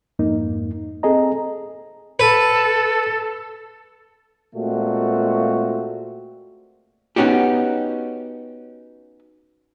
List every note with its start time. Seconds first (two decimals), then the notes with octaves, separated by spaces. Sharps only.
0.19 F2 G#2 A#3 D#4
1.03 C4 G#4 A4 D#5 A#5
2.20 A4 B4
4.54 A#2 G#3 A3 C4 F#4
7.16 B3 C#4 D#4 F#4 G4